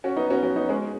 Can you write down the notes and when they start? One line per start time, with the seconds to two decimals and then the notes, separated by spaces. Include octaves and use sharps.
0.04 C#4 F#4
0.17 B3 D#4
0.30 C#4 F#4
0.43 C#4 F#4
0.56 B3 D#4
0.69 G#3 C#4